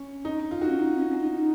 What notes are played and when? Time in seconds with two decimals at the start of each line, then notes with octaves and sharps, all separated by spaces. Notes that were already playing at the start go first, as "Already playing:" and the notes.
Already playing: C#4
0.25 D#4
0.51 F4
0.61 D#4 F#4
0.69 C#4
0.79 D#4
0.97 C#4
1.09 C#4
1.22 D#4
1.34 D#4